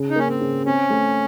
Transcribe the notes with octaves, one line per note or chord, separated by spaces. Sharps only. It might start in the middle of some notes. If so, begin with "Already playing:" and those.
Already playing: C#3
D#4
A#3 C#4
C4
C#3
C4 C#4
A3